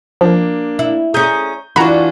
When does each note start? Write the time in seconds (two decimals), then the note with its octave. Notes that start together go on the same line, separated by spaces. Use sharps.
0.21 F3 A#3 D4
0.79 E4
1.14 C#4 G#4 A#5 D#6 G6
1.76 E3 D4 F4 F#4 A#5 B5